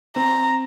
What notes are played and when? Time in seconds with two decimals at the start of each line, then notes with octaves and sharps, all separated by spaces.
0.16 C4 A#5